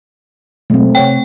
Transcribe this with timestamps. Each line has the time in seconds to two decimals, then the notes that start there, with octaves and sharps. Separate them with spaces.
0.70 B2 F#3 G#3 A3 C4
0.95 C3 C#5 F#5 G5